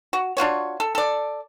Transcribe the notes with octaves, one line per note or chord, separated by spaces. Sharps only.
F#4
D4 F4 F#4 C#5
A4
A4 D5